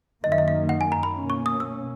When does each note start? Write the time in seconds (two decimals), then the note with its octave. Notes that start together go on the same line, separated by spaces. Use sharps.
0.24 F#2 D#3 A#3 D#5
0.32 E5
0.38 D#5
0.48 E5
0.69 F#5
0.81 G#5
0.92 A#5
1.03 B5
1.15 B2 A#3 C#4
1.30 C#6
1.46 D#6
1.60 E6